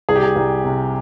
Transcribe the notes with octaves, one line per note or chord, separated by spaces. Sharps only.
C2 G#4
G4
G#4
C2
C3